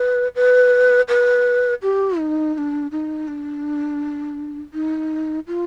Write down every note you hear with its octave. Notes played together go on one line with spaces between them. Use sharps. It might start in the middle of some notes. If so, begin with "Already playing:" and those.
Already playing: B4
B4
B4
G4
D#4
D#4
D4
D#4
D4
D#4
F4